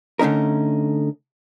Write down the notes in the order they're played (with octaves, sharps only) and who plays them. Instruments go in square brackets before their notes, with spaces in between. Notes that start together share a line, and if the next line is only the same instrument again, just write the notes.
[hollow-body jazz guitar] D3 A3 C#4 D#4 A#4